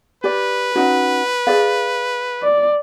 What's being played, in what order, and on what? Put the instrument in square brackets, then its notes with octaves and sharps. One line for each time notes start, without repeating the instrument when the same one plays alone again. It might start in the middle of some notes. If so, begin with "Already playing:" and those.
[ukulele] G4 D5 [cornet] B4
[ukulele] C#4 D#4 F#4
G#4 D5 F5
[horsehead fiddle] D5